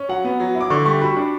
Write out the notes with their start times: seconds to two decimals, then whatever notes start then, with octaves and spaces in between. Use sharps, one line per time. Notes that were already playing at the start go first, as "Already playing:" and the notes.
Already playing: C#4
0.09 F#3 F#5
0.24 B3
0.40 F#3
0.55 E4
0.60 D6
0.70 D3 C#6
0.85 G3 C#6
1.01 F#4 B5
1.17 D4